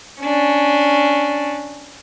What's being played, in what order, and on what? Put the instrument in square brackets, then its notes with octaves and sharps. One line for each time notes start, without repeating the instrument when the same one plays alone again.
[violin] C#4 D4